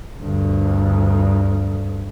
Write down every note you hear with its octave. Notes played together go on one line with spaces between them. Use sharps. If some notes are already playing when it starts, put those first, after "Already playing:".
D2 G2